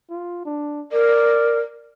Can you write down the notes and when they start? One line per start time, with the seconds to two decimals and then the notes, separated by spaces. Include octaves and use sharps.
0.10 F4
0.45 D4
0.92 A#4 D5